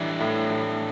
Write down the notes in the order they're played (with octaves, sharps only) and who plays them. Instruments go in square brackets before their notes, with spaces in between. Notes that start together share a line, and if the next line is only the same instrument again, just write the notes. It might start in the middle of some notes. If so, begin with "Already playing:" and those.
Already playing: [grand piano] A2 E3 G3 [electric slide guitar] D4 E4
[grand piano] A2
A2